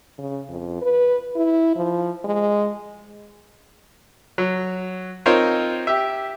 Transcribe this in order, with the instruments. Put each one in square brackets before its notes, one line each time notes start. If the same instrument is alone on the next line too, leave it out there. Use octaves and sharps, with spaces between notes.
[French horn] C#3
F2
B4
E4
F3
G#3
[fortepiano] F#3
C4 D#4 F4 A#4 C5 C#5
G4 E5